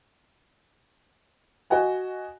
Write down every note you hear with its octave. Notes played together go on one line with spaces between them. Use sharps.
F#4 D#5 F#5 G#5